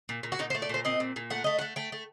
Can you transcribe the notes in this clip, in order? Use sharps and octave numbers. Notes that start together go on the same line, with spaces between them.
A#2
A#2
F#4
A#2 D#4
C5
A3
D5
A#2 C5
C4 D#5
A#2
A#2
A3 F#5
A3 D#5
F#5
A3
A3 G5
A3